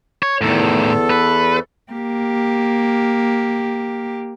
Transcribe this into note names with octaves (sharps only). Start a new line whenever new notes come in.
C#5
E2 A2 D#3 A4
B4
A#3 G4